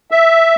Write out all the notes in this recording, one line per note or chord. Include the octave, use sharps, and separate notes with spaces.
E5